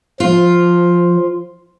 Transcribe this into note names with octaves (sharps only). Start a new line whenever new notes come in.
F3 F4